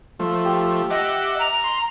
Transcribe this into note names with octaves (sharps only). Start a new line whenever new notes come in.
F3 A3
G4
D#5 E5 F#5 D6
A#5
C6